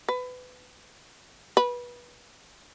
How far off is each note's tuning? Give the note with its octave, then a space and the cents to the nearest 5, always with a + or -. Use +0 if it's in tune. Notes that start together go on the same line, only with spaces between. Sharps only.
B4 +25
B4 -25